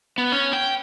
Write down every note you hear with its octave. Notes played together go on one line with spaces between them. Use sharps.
B3
C#4
G5